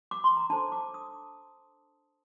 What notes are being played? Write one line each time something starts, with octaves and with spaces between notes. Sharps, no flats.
D6
C6
A#5
D4 A4 C5 A5
D6
D#6